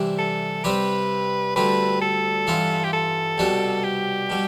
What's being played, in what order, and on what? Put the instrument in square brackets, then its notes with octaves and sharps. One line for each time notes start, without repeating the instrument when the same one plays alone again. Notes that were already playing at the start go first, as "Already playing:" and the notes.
Already playing: [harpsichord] C3 E3 G3 D4
[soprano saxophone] A4
[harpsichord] C3 G3 C4 G4 [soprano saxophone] B4
[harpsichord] D2 D3 G3 C4 [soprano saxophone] B4
[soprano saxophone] A4
[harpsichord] G2 E3 B3 F4
[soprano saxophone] G4
A4
[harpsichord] C2 B2 G3 B3 D4
[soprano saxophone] G4
[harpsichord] B2 G3